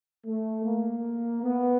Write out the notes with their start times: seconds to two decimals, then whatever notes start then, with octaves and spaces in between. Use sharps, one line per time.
0.25 A3
0.64 A#3
1.43 B3